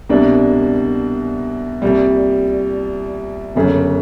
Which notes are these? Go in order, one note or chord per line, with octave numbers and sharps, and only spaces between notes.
C2 B2 G3 A#3 D4
C2 A#2 G3
G1 F#2 C#3